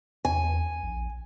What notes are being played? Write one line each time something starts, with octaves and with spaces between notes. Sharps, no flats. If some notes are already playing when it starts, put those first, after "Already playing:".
E2 G#5
A#1